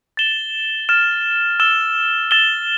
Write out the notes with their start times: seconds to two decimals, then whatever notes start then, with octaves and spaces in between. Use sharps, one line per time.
0.17 A6 E7 G7
0.89 F6 A6 E7
1.60 E6 A6 E7 G7
2.31 E6 A6 E7 G7